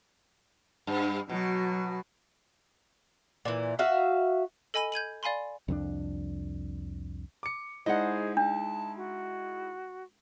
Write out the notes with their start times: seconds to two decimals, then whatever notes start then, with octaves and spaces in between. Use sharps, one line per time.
0.87 G2
1.29 B2 F#3
3.45 A#2 E3
3.79 F#4 E5 F5
4.74 A4 D#5 G#5 B5 D#7
4.92 G6 G#6 D#7 F#7
5.23 D5 F5 G#5 B5 C6
5.68 C2 F2 G#3 D4
7.43 D6 C#7
7.86 G#3 D#4 E4 G#4 C5 D#5 F#5
8.37 D4 A5
8.96 F#4